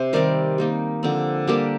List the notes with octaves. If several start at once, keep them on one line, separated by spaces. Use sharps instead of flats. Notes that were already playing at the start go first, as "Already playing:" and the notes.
Already playing: C3 C5
D#3 G3 C4 A#4 D5
G3 A#3 D#4
D3 F3 C4
G3 A#3 D4 G4 A#4